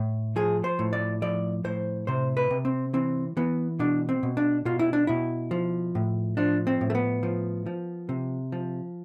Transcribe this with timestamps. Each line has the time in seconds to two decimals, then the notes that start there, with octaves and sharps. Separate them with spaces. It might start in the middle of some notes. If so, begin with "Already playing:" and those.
Already playing: A2
0.36 F3 G#4
0.64 C5
0.79 A2
0.93 D5
1.22 F3 D5
1.64 A2 C5
2.07 C3 C5
2.37 B4
2.51 C3
2.65 C4
2.93 E3 C4
3.37 E3 B3
3.79 B2 D4
4.09 C4
4.23 B2
4.37 D4
4.65 B2 F4
4.79 E4
4.93 D4
5.07 B2 E4
5.51 F3
5.95 A2
6.37 F3 D4
6.67 C4
6.81 A2
6.90 A3
6.95 B3
7.23 F3
7.66 F3
8.09 C3
8.52 F3